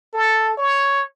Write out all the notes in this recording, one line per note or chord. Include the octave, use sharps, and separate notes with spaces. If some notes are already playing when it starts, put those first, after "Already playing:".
A4
C#5